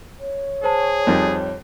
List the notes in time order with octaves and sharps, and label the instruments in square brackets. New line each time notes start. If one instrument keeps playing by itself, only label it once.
[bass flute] C#5
[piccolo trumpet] G#4 [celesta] C5 A5
[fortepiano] F2 D#3 G3